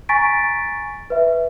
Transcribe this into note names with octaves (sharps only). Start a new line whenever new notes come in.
G#5 A#5 C#6 A6 B6 D7
B4 E5